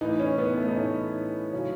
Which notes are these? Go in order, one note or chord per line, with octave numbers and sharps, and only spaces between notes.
A2 E3 D#4
C#4
B3
A3
D#4
A2 E3 C#4
C#3 F#3 C#4